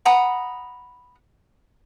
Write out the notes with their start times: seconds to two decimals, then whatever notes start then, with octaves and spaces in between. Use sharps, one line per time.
0.05 F#5 A#5 B5 D#6